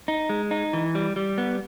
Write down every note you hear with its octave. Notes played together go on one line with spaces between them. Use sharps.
D#4
G#3
D#4
E3
G3
G3
B3